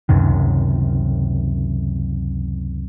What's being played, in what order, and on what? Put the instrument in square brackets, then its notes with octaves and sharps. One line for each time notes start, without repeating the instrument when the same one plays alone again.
[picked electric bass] C#2 F#2 C3 D#3